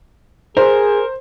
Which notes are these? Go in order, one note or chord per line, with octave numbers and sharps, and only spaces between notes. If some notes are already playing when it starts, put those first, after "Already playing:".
G#4 A#4 C5